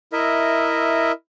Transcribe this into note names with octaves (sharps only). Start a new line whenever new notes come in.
E4 A#4 D#5 E5